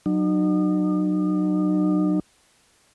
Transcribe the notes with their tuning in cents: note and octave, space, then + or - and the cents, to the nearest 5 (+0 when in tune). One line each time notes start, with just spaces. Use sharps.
F#3 +0 D#4 -40